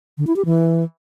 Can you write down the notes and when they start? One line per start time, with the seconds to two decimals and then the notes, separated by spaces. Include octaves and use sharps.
0.18 D3
0.27 E4
0.36 G4
0.45 E3